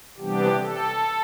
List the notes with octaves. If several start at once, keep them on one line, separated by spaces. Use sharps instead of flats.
C3 E3 G3 B3 D4 G4
A4